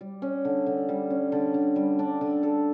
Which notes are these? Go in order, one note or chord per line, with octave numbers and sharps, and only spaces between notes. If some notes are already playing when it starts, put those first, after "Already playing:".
G3
C#4
D3
D3
G3
C#4
D3
D3
G3
D4
D3
A4